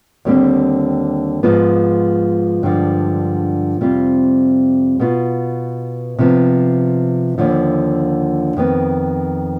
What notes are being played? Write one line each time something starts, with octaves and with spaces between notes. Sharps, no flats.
D#2 D3 G3 C4
G#2 F3 G#3 B3 F4
G2 D3 F3 G#3
F2 C3 G3 C4 F4
B2 B3 F4
C3 F3 B3
D#2 D3 F3
F2 D#3 B3